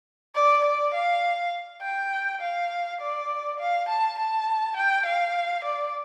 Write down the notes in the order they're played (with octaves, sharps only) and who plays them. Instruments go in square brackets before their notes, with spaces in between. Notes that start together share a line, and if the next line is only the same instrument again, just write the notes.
[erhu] D5
D5
F5
G5
F5
D5
F5
A5
A5
G5
F5
D5